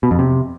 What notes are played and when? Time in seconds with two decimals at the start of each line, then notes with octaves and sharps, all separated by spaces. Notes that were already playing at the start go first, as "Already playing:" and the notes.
0.03 B2
0.11 F2
0.19 C3